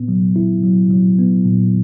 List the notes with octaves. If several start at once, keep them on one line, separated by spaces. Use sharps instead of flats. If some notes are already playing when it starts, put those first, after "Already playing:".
Already playing: A#2 B3
F#3
E4
F#3
F#3
B3
A#2